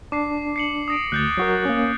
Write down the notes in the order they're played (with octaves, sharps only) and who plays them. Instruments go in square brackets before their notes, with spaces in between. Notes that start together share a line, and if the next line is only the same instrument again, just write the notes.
[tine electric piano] D4 [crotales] D6 C7
[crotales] C7 C#7 F#7
D#6 A#6 D7
[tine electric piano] D2 [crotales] F#6 G6 A6
[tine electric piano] F#3 F#4 A#4
A#3 C#4